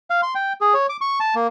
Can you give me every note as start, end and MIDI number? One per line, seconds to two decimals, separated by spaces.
0.10 0.21 77
0.23 0.34 84
0.35 0.53 79
0.61 0.74 68
0.74 0.87 73
0.89 0.97 86
1.01 1.19 85
1.20 1.35 81
1.35 1.47 58